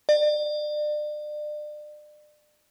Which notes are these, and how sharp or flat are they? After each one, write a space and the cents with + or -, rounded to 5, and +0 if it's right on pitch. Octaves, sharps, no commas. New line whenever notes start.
D5 +35